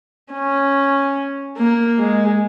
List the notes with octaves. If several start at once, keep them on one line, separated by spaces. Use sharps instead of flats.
C#4
A#3
G#3